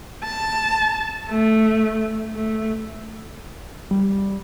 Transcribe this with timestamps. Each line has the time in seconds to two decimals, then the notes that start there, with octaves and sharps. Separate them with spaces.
0.24 A5
1.29 A3
2.35 A3
3.91 G3